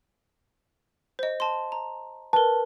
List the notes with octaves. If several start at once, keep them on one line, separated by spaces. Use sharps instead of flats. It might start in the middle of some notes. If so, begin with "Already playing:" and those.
C5 D#5
A5 C6
A#5
A#4 B4 A5